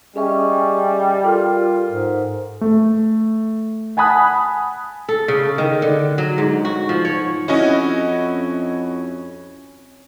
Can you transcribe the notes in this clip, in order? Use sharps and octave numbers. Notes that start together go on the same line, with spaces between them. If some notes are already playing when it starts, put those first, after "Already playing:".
G3 C#4 G#4 D#5 E5
F4 A4 A#4
G#2
A3
F#5 G#5 A5 B5 D#6 F#6
A4
C#3
D#3
D3
F#3
G#2
F#4
F3
C#5
F2 C#4 E4 F#4 D#5